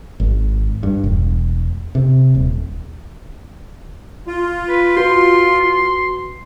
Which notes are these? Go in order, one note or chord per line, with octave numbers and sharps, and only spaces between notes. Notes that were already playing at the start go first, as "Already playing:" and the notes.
G#1
G2
E1
C3
D#1
F4
B4
F#4 B4 C6